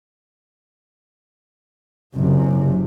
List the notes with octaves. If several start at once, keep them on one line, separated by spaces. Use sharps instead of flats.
F#1 C3